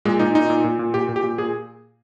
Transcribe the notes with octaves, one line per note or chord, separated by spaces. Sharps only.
A#2 G#3
A#2 D#4
A#2 D#4
A#2
A#2
A#2
A#2 G4
A#2
G4
A#2
A#2 G#4